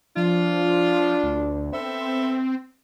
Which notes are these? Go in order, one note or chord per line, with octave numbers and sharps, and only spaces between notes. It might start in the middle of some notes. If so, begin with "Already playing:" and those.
F3 D4 F4
D2
B3 C4 A4 E5